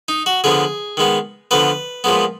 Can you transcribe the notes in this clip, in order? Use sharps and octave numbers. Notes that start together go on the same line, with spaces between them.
D#4
F#4
D3 F3 B3 G#4
D#3 G#3 B3
D3 F3 B3 B4
A#2 F3 G#3 B3